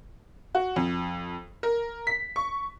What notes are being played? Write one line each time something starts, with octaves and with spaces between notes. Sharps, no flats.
F#4
F2
A#4
B6
C#6